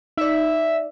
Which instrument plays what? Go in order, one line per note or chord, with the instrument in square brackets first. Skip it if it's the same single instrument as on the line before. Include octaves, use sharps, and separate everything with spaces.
[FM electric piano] D#4 D5 [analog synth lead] E5